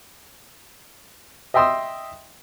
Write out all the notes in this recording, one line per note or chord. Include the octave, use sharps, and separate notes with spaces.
D#5 E5 G5 C6 D#6 E6